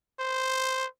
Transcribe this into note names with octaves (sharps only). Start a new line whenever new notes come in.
C5